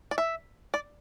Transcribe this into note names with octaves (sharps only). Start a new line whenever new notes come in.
D5
E5
D5